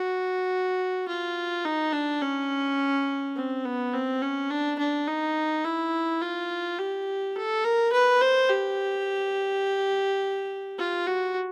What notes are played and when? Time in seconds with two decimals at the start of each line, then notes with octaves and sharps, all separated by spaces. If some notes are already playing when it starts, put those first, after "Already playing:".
Already playing: F#4
1.08 F4
1.65 D#4
1.93 D4
2.22 C#4
3.36 C4
3.65 B3
3.94 C4
4.22 C#4
4.51 D4
4.79 D4
5.07 D#4
5.64 E4
6.22 F4
6.78 G4
7.36 A4
7.65 A#4
7.92 B4
8.21 C5
8.50 G4
10.78 F4
11.06 F#4